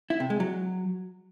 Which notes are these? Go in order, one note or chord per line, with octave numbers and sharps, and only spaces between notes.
E4
C3
G#3
F#3